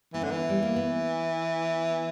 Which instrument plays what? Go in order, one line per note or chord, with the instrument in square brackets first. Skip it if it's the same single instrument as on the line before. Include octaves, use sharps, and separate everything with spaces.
[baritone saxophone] E3 [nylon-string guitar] B3
[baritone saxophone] D3 [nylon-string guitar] C#4
[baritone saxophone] E3 [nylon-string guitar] B3
[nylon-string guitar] G3
A#3
B3